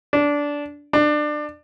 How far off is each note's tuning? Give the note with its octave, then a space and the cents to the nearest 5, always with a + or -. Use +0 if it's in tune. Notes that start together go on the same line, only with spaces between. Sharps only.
D4 -15
D4 +25